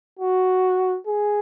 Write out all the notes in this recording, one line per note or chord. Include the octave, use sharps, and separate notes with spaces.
F#4
G#4